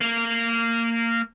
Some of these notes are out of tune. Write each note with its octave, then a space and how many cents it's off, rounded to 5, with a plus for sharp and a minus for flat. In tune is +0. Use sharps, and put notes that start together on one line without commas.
A#3 -20